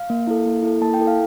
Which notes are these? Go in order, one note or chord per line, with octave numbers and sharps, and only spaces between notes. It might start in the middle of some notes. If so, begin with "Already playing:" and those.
Already playing: F5
A#3
E4 A4
A#3
E4 A4
A#3 A5
G5
E4 A4
F5